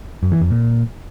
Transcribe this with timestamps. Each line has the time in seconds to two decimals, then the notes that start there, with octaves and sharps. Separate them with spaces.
0.23 F#2
0.32 E3
0.41 F2
0.50 A#2